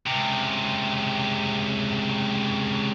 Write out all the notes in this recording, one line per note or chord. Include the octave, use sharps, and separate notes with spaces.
C#2 C3